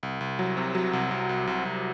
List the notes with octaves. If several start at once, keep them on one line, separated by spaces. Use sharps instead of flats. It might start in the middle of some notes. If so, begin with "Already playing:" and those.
C2
C2
F#3
C3
F#3
C2
C2
C2
C2
C2